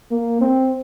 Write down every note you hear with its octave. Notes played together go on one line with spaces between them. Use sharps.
A#3
C4